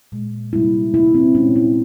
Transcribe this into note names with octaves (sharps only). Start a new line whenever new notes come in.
A#2 G#3
C3 G3 A#3 E4
C3 E3 G3 A#3 E4
C4
A#2 G#3 C#4
E4